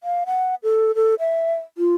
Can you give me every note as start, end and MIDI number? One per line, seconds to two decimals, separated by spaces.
0.03 0.24 77
0.26 0.55 78
0.63 0.95 69
0.95 1.15 69
1.19 1.55 76
1.78 1.96 65